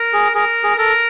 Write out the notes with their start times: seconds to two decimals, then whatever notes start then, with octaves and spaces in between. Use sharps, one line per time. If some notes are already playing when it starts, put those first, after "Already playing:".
Already playing: A#4
0.13 G#4
0.35 G#4 A#4
0.64 G#4
0.78 A4 A#4